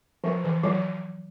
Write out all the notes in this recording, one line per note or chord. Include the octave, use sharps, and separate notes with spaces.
F3
E3
F#3